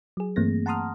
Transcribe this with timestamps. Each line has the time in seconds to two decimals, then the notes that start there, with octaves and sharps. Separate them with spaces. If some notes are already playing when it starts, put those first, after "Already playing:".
0.17 F#3 G#4
0.36 G2 E3 A3 A#3 C4 A#6
0.66 F#5 A5 A#5 C6 D#6 F6